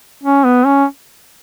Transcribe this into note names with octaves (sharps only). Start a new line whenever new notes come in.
C#4
B3
C#4